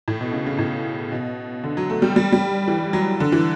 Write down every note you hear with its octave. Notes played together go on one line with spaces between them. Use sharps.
A2
B2
C#3
C#3
A2
B2
D3
F#3
A3
G3
G3
G3
E3
F#3
D3
E3